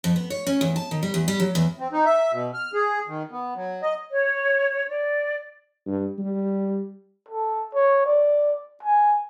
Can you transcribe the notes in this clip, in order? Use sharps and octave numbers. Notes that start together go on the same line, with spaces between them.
F2
B3
C#5
C#4
E2
A5
D#3
G3
E2
G3
F#3
E2
C4
D#4
E5
B2
F6
G#4
D#3
B3
F#3
D#5
C#5
D5
G2
G3
A4
C#5
D5
G#5